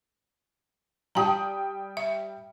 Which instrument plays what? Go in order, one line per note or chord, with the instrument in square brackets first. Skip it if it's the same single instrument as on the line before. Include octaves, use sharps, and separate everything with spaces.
[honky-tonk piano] G3 G5 D#6 [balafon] A5 A#5
[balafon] E5